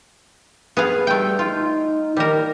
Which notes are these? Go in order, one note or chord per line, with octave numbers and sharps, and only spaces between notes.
B3 G#4 F5
G3 A3 G5
D#4 F4
D#3 G3 A#4